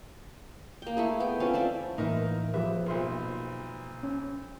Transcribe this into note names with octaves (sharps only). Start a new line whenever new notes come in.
A#3 G5
A3 E4 G#4
B3 G5
C4 C#4 F4
F3 C5 D5 E5
A2 E3 A#3 D#4 A#4 B4 E5
F3 G4 G#4 B4 E5
B1 A#2 C5 C6
C#4